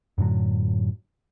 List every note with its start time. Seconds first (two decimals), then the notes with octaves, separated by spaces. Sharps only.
0.18 F#2 A2 D3 F#3